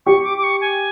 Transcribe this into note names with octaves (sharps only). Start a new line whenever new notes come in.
G4 C#6
D6
D6
C#6
G#5